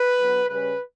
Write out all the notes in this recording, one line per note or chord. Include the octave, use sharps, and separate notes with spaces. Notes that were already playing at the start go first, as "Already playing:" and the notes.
Already playing: B4
D3 F#3 B3
C#3 G3 C#4 B4